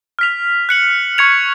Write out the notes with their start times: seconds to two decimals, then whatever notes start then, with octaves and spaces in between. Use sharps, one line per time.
0.19 F6 B6 F7
0.69 F#6 C#7 F#7
1.18 C#6 G#6 C#7 F7